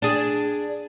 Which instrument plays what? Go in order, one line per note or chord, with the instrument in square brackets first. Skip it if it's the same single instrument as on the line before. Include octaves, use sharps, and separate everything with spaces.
[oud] D4 G#4